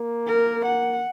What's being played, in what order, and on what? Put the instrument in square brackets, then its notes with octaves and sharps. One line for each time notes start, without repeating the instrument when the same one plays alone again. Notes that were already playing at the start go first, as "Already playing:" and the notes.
Already playing: [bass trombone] A#3
[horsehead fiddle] A#4
F#5